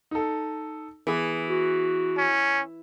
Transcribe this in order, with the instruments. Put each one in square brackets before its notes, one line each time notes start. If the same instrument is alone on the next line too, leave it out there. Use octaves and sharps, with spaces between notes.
[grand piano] D#4 A4
[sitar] E3 [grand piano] B3 G#4
[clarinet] F#4
[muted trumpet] C#4